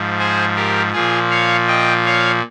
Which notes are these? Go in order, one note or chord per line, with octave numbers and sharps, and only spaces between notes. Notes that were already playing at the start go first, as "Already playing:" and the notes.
Already playing: G#2 F3
G#4 C5
G4 A#4
A#2 F3 F4 G#4
C#5 F5
D#5 G5
C#5 F5